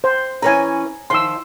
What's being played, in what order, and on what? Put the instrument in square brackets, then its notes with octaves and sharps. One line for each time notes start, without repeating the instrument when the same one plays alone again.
[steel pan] C5
[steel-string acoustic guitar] E3 C#4 B4 [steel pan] G#5 A#5
[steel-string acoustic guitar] D#3 F3 [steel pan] C6 E6